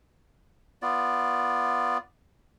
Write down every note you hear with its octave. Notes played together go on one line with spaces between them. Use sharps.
B3 F4 D5